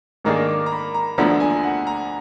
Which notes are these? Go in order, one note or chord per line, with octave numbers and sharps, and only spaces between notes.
G#2 D#3 A#3 D4 G#4 A#5
D6
A#5
B5
A#5
D2 D3 F3 B3 A#5
G#5
F#5
A#5